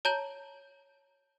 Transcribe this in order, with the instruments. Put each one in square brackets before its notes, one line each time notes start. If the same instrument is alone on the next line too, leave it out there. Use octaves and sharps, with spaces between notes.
[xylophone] C#5 A5 A#5 G6 F#7